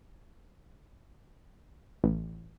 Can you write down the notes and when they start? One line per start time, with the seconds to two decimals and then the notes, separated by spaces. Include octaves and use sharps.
2.04 A1